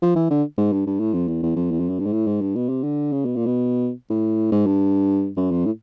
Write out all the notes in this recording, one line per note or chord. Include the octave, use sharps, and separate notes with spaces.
F3
E3
D3
G#2
G2
G2
A2
F2
E2
E2
F2
E2
F2
F#2
G2
G#2
A2
G#2
G2
B2
C3
D3
C#3
B2
A#2
B2
A2
G#2
G2
F#2
F2
A2